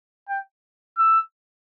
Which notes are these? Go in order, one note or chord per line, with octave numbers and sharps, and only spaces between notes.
G5
E6